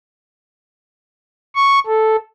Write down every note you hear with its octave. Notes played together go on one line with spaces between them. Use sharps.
C#6
A4